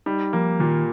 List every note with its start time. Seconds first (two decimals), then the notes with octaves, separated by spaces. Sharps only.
0.06 G3 D#4
0.33 F3 A#3
0.59 A#2 D#3